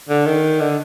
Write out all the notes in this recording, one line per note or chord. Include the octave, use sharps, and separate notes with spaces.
D3
D#3
D3